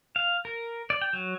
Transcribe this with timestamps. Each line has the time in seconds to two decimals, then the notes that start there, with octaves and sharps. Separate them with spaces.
0.16 F5
0.45 A#4
0.90 D5
1.01 G5
1.13 F#3